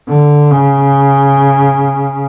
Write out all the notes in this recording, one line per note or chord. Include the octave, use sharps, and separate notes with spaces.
D3
C#3